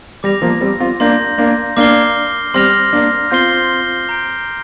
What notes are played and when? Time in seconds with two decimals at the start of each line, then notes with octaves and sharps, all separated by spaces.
0.23 G3 D6 A#6 F7
0.42 F3 A#3
0.61 G3 C4
0.80 C4 F4
1.00 A#3 D4 C6 G6 A#6
1.38 A#3 D4
1.77 A#3 D4 D6 F6 C7 G7
2.54 G3 C4 C6 F6 A#6 F7
2.93 A#3 D4
3.31 C4 F4 G6 C7 G7
4.09 A#5 G6 D7